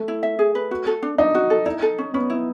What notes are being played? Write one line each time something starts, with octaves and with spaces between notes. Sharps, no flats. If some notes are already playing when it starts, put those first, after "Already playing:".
Already playing: A3
E4
E5
G#4
B4
F#4
A4
D4
D4 D#4
F#4
A4
D#4 E4
A4
C#4
B3 C#4
E4